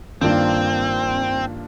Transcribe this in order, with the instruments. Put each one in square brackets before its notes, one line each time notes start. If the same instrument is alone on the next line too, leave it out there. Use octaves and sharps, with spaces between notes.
[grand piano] G2 D#3 A#3 D4 F4 [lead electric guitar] C4